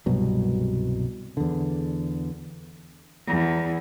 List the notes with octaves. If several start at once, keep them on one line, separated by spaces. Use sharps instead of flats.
C2 G2 B2 F#3
E2 D3
E2